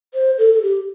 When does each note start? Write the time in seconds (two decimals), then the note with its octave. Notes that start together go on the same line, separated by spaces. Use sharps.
0.14 C5
0.38 A4
0.54 A4
0.62 G4